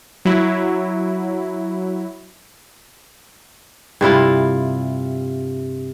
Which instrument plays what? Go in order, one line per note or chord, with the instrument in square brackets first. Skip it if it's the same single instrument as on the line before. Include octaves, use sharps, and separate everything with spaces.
[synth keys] F#3 E4
[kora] G2 C3 E4 F4